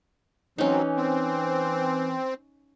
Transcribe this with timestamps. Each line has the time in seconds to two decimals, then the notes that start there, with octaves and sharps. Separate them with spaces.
0.58 E3 F#3 C4 C#4 D#4
0.96 C4